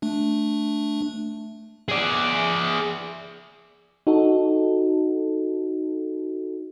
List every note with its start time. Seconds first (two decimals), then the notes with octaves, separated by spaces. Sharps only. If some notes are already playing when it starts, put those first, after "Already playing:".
0.02 A3 D4
1.89 G#4 D5
4.07 D#4 F#4 A4